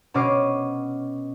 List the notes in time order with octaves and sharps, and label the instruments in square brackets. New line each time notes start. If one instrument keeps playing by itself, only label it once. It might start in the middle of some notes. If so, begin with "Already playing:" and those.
[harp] B2 C#4 D#5 D6 F6 C7